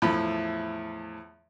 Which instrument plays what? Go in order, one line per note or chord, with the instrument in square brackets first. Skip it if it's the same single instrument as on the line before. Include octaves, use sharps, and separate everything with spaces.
[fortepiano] E2 A2 F3 B5